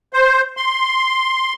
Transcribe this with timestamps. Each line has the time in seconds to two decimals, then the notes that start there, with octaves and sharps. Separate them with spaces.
0.13 C5
0.57 C6